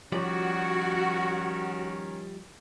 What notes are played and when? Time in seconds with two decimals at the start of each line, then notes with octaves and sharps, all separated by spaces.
0.12 D#3 F3 G3 C#4 F#4 D5